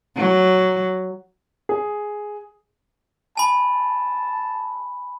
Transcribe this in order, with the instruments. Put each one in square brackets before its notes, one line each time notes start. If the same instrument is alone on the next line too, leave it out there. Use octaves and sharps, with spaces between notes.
[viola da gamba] F#3
[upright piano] G#4
[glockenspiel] G#5 B5 [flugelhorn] A5